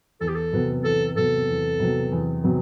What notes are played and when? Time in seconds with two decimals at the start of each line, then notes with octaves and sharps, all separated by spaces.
0.21 E2 A4
0.28 G4
0.35 A4
0.53 C3 F#3 B3
0.84 E2 A4
1.16 C3 F#3 B3 A4
1.49 E2
1.80 C3 F#3 B3
2.12 E2
2.44 C3 F#3 B3